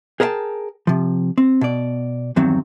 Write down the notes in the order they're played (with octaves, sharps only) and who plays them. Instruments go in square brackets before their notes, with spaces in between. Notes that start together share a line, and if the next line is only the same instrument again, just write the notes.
[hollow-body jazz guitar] G#4 A#4 C5 E5 G5 A5
C3 F3
C4
B2 D5
E2 G2 D#3 F#3 C4